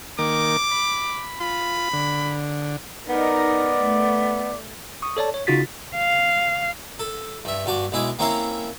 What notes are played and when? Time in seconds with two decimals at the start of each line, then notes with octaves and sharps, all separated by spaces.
0.19 D#3 A#3 A#4 D6
0.71 B5
1.40 F4 B5
1.93 D3
3.09 B3 D#4 A#4 D5
3.81 A3
5.02 C#6 D#6
5.17 A4 C#5 D5 A5
5.34 C#5
5.47 C#3 D#4 F4 F#4 A6 B6
5.95 F5
6.99 A4
7.45 G2 E5
7.66 G2 F#4 A5 D6
7.92 B1 G#3 E4 G#5 D6
8.19 A#3 C4 C#4 E4 A#4 F5